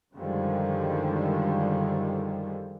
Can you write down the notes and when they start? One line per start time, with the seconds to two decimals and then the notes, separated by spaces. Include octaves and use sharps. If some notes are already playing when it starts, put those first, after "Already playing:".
0.16 F#2 D3 D#3 F3 G3 G#3